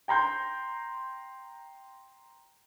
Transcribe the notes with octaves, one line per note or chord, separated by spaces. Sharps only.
G5 A#5 C6 G6